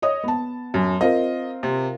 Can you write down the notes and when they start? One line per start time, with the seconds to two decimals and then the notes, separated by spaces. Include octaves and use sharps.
0.02 C#5 D#5 D#6
0.24 B3 A5
0.74 F#2
1.01 C4 F4 A#4 D#5
1.63 C3